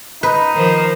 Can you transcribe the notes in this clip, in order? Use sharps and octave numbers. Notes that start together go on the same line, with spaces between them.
D#4 B4
D#3 F3 C5